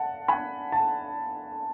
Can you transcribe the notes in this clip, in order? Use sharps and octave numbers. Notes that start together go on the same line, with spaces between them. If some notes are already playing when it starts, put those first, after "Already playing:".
Already playing: F#5 A5
G#5 B5
A5